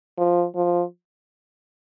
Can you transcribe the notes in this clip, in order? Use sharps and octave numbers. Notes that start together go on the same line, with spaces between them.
F3
F3